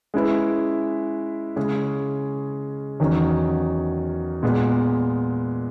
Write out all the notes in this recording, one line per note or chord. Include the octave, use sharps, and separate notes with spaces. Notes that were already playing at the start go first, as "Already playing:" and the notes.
G#3 C#4 E4 B4
C#3 G#3 C#4 G#4
E2 D#3 F#3 C#4
A#2 G#3 B3